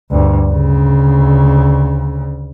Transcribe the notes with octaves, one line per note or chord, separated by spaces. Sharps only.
D2 G2
D2 C#3